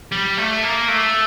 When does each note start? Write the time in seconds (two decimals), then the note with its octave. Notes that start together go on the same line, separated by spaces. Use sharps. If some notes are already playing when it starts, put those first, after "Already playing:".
0.12 G3
0.37 A3
0.63 A#3
0.88 A3